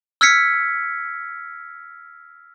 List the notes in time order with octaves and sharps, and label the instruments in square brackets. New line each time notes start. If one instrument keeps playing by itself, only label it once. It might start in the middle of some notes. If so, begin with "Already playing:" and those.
[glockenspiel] E6 F6 G#6 B6 C#7